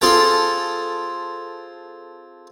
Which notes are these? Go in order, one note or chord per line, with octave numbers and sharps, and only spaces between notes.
C4 F4 G#4 A4 G5